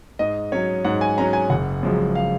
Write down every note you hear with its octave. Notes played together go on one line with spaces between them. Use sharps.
G#2 D#5
F#3 C#4 C#5
G#2 F#5
G#5
F#3 C#4 A#5
G#5
F#1 F#5
F#2 F3 G#3
F5